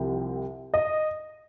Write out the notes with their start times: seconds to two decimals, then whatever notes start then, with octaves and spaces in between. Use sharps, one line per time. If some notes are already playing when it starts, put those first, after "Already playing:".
Already playing: C2 C3 F3
0.74 D#5